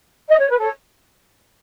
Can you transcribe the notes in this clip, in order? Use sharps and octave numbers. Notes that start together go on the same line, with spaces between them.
D#5
C#5
B4
A4 C#5